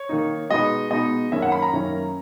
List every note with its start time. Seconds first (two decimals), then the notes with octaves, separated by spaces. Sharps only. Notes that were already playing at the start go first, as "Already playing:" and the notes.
Already playing: C#5
0.09 D#3 A#3 D#4
0.50 B2 G#3 B3 D#4 D#5
0.91 B2 G#3 B3 D#4 D#5
1.32 F#2 D#3 A#3 C#4 E4 E5
1.42 F#5
1.52 B5
1.62 A#5
1.73 F#2 D#3 A#3 C#4 E4